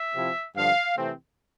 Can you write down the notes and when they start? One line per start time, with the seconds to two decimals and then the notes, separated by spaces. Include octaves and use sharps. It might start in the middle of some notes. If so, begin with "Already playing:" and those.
Already playing: E5
0.14 C3 F3 C4 E4
0.56 G2 D3 F3 F5
0.97 C3 E3 A3 C4